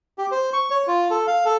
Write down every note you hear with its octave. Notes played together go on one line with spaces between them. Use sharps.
G4
C5
C#6
C#5
F4
A4
F5
A4